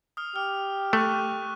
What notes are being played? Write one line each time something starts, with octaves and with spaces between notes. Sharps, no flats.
D#6 F6
G4 F6
A3 C#6 F#6